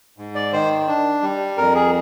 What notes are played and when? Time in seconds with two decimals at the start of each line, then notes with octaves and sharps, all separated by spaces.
0.18 G#2
0.35 D5
0.53 D#3 C5
0.88 D4
1.22 G3
1.58 F2 A#4
1.75 G#4